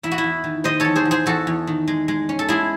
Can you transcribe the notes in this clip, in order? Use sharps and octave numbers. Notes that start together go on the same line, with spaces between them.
E2 E4
F#4
E4
E2
D#3
D#3 C5 D#5
E2 A4 C#5
G#4 C5
E2
G#4 C5
E2 F#4 A4
E2
D#3
G#3
G#3
C#4
A4
G#3 E4 G#4